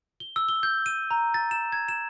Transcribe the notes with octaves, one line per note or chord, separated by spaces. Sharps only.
G7
E6
G7
G6
D#7
A#5
A6
E7
G#6
E7